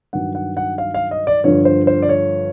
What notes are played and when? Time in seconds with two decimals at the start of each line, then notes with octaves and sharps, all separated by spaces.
0.13 G2 D#3 F#3 F#5
0.35 F#5
0.57 F#5
0.78 F5
0.94 F5
1.11 D#5
1.27 D5
1.44 G2 D3 F3 C#5
1.65 C5
1.87 C5
2.02 D5
2.09 C#5